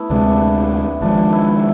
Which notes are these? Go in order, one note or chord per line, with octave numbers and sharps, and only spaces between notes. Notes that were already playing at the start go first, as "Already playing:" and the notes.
Already playing: A3 B3 E4
D2 C3 G#3 D4
G#1 G#2 F3 D4
E4